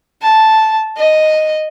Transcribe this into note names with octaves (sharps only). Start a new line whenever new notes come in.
A5
D#5